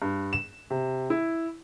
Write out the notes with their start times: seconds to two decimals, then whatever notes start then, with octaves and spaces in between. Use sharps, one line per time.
0.02 G2
0.33 E7
0.70 C3
1.10 E4